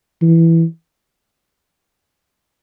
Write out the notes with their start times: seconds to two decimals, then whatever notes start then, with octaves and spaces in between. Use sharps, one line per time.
0.22 E3